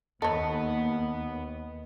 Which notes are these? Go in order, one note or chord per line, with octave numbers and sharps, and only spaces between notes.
D#2 B3 A4 C#5 D#5